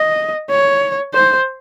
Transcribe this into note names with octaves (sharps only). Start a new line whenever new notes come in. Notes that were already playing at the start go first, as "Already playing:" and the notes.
Already playing: D#5
C#5
C5